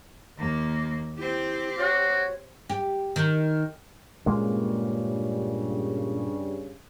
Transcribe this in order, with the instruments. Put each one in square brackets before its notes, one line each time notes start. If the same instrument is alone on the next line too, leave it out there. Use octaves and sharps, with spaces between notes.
[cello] D#2 A#3
[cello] C4 G4 [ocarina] E4
[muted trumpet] F#4 [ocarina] C#5
[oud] G4
D#3
[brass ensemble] G2 C#3 G3 [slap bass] A#2 G#3 A#3